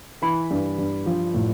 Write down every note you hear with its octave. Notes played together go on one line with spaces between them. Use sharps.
E3 B5
G2
G2
F3
A2